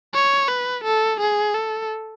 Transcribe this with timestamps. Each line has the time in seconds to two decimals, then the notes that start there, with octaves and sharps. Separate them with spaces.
0.14 C#5
0.48 B4
0.84 A4
1.20 G#4
1.54 A4